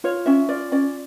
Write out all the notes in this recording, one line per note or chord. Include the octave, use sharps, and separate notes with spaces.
F4 C#5
C#4 E5
F4 D5
C#4 D5